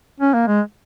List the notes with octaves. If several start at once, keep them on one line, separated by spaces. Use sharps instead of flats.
C#4
A#3
G#3